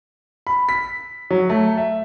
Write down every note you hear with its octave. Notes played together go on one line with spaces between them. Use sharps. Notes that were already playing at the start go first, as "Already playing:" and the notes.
B5
B6
F#3
A3
E5